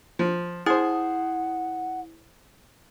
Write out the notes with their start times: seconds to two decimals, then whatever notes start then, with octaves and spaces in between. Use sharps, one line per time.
0.19 F3
0.66 E4 G#4 C5 F#5 D#6